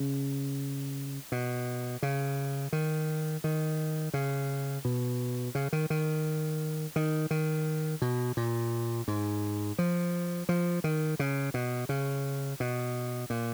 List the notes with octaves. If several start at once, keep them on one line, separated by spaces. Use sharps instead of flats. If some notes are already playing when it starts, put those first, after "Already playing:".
Already playing: C#3
B2
C#3
D#3
D#3
C#3
B2
C#3
D#3
D#3
D#3
D#3
B2
A#2
G#2
F3
F3
D#3
C#3
B2
C#3
B2
A#2